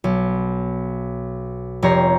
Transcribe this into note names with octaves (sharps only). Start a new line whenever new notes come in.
B1
F1 G4 C#5 A#5 C7